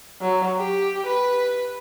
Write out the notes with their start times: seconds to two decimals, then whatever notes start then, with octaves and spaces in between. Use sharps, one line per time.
0.21 F#3
0.58 G4
1.06 B4